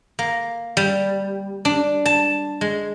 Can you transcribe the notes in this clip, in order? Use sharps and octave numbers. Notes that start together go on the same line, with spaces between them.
A#3
G3
D4
A5
G#3